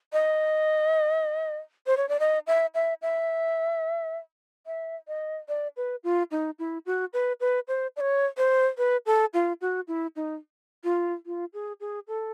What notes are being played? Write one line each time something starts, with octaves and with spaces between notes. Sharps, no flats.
D#5
C5
C#5
D5
D#5
E5
E5
E5
E5
D#5
D5
B4
F4
D#4
E4
F#4
B4
B4
C5
D5
C#5
C5
B4
A4
F4
F#4
E4
D#4
F4
F4
G#4
G#4
A4